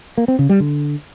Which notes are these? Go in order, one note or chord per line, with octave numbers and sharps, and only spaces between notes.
A#3
C4
C#3
G3
D3